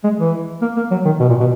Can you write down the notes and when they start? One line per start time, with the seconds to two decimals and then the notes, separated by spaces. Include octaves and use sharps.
0.04 G#3
0.19 E3
0.62 A#3
0.76 A#3
0.91 F#3
1.05 D#3
1.20 B2
1.29 A#2
1.40 B2